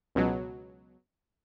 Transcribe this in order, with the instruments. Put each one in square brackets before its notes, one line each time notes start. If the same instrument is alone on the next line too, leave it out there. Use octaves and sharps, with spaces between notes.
[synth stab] C#2 B2 F#3